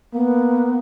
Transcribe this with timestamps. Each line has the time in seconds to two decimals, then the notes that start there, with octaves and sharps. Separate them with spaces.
0.14 A#3 B3